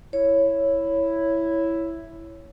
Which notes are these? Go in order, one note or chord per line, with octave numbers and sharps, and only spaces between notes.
E4 C#5